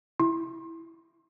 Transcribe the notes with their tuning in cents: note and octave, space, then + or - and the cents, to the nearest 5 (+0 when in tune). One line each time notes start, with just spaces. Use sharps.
E4 +0 C6 +30